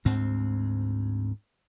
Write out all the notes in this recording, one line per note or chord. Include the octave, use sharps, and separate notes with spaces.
D2 G#2 C4